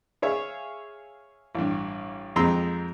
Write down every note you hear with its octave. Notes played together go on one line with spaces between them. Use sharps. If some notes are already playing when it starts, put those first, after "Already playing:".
G#4 C#5 E5 F5
A1 G2
F2 G#3 C4 A#5 C6 E6